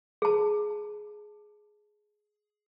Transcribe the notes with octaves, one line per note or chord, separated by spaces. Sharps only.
G#4 A5